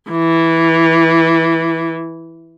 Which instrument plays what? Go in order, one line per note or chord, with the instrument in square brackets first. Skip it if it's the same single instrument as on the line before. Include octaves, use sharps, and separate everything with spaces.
[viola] E3